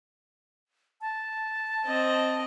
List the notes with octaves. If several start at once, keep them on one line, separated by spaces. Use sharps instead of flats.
A5
C4 D#5